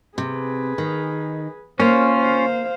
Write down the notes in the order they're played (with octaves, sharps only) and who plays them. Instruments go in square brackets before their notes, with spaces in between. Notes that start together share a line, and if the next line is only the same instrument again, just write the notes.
[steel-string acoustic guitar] C3 [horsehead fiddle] G#4 B4
[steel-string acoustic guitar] D#3
[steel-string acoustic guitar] A#3 [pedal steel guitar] C#4 F4 [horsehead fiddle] C5
[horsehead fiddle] C5 F5